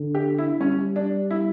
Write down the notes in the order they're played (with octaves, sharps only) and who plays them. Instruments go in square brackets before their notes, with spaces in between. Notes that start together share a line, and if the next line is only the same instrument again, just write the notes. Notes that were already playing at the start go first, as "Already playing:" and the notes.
Already playing: [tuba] D3
[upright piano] G4
E4
[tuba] G3 [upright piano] C#4
[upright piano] D4
E4